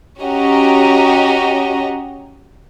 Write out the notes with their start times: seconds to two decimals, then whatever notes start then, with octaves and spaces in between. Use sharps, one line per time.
0.21 C#4 F#4 G4 D#5 A#5